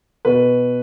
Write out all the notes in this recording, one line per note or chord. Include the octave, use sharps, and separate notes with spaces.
B2 B4